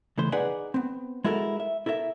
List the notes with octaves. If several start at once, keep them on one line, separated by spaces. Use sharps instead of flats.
C#3 E3 A3 C5
D#4 G#4 B4 D5 F#5 G#5
B3 C4
G#3 E4 F#4 A4 A#4
E5
E4 A4 A#4 C#5 E5